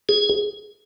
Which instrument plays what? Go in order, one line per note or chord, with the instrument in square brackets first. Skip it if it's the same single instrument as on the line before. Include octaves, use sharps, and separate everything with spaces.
[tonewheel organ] G#4